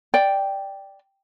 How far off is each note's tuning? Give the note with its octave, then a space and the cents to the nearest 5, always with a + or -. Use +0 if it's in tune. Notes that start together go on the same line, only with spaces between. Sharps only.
D5 +0 G5 +0